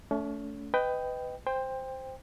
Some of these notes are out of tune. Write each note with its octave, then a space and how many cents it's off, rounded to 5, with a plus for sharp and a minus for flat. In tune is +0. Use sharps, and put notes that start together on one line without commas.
A3 +0 C#4 +40
B4 +20 D#5 +0 G5 +0
C5 +0 G5 +20